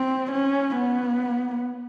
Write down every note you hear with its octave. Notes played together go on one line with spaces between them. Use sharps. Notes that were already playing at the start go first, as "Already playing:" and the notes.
Already playing: C4
C#4
B3